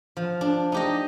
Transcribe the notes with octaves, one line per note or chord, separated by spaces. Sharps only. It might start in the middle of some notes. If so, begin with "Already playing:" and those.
F3
D4
D#4 G4 D#5